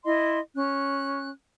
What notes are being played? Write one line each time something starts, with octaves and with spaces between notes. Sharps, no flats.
E4 D#5 C6
C#4 F#6